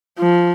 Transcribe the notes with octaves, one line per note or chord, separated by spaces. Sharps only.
F3